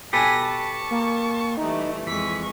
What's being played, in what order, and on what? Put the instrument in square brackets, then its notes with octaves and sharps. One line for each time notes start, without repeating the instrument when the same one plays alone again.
[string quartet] B2 G#5 A#6 [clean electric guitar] G4 A4 B4
[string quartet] A5 C#6
[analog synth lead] A#3
[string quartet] E3 G3 A3 [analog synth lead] D#4
[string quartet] F2 G#3 C#6 [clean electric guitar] E3 [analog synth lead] B6